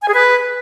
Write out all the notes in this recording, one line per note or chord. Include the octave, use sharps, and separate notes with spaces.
G#5
G#4
B4